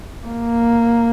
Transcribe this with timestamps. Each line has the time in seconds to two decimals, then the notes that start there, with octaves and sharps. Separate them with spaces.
0.27 A#3